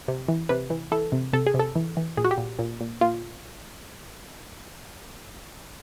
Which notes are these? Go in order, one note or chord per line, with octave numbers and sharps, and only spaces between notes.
C3
E3
C3 B4
E3
E3 A4
C3
C3 A4
G#4
C3
A4
E3
E3
A#2 G#4
F#4
G4
A#2
A#2
A#2
A#2 F4